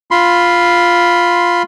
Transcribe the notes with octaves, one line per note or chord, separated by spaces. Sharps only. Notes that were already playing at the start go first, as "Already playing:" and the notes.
F4 B5 C6